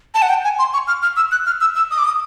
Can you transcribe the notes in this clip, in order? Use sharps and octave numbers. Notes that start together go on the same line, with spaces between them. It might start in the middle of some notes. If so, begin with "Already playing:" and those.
A5
F#5
G5
G#5
C6
C#6
F6
F6
E6
F#6
F6
E6
E6
D#6
D6
D#6